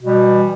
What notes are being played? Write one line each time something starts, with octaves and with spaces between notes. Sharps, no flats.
B2 E3 G3